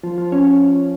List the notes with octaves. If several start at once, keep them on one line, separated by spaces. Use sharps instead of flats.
F3
F3
C#4